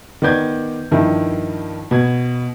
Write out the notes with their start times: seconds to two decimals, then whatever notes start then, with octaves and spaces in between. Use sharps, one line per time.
0.22 D#3 B3 D5 G6 G#6
0.91 G2 D#3 F3 E4
1.91 B2 G#6